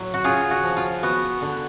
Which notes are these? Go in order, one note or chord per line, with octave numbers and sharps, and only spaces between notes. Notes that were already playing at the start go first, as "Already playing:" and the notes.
Already playing: A2 F#3
F#4
C#3 F4 G#4
F#4
F3
F4
B3 F#4
D3